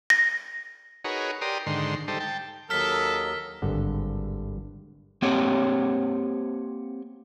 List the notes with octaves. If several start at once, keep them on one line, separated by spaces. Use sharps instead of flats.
A#6
D#4 F#4 G#4 A#4 B4 C#5
G4 A#4 D5 C6 D#6
G#2 D3 D#3 C6
G3 D#4 A4 C5
G5 A5
D#2 F#3 A4 A#4 D#5 E6 F6 B6
G#1 G2 D3 F#5
A#3 C4 G4 C#5 F#5 G5